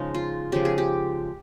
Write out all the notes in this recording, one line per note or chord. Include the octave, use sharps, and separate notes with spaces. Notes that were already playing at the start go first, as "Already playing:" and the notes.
Already playing: C#3 F3 G#3 D#4
F4
C#3 F3 G#3 G4
G#4
G4